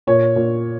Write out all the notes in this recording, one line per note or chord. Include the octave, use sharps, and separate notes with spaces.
A#2 C#5
A#2